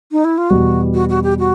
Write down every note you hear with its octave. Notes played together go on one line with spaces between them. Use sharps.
D#4
E4
F4
E2 B2 G3 F#4
F#4
F#4
G4
F#4